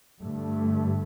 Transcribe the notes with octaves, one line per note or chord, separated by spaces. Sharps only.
G2 D3 A3